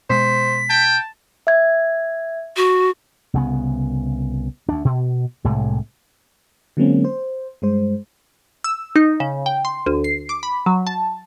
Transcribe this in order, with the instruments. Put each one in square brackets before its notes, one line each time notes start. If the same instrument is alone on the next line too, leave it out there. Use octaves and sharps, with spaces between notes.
[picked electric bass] B2 G#3 [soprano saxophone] C5 [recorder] B6
[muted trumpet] G5 [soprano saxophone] A5
[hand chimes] E5 G#6
[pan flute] F#4
[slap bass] C2 C#3 B3
D2 D4
B2
C2 A2 C3 G#3
[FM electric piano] D3 F#3 G#3 A#3 C4 C#4
C5
G2 G#3 C5
[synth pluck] E6
D#4
C#3
G5
C6
D2
C7
D6
B5
F#3
A5